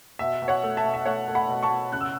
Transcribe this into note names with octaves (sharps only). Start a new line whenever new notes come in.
B2 E5
B2
C#5 F#5
A3
E5 A5
B2
E5
A3 C#5 F#5
A3
F#5 B5
B2
A5 C#6
B2
C#3 F#6
E6